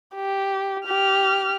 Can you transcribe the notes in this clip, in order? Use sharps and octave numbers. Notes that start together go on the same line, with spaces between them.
G4
G4 F6